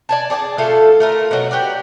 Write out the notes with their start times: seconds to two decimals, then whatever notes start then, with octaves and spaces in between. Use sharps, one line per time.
0.09 D5 G#5 A5
0.30 G#4 D5 G#5 A5
0.58 A3 F4 A4 F5
1.00 A3 F4 A#4
1.31 B2 F#3
1.51 F#4 G4 B4 D5